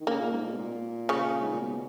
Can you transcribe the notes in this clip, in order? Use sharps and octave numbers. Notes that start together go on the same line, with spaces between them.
D#3
C#3 A#3
A#2
G#2
A#2
B2
A#2
C#3 C#4
G#2
A#2
B2